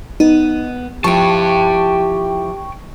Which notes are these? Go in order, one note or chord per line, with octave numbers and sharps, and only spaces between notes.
B3 D#4
F3 E4 G4 G5 A5 C#6